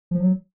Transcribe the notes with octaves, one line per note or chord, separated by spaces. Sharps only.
F3
F#3